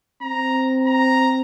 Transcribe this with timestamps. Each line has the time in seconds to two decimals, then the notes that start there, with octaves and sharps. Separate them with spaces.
0.22 C4 A#5
0.87 A#5